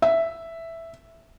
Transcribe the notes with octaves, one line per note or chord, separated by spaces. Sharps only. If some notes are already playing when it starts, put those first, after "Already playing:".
E5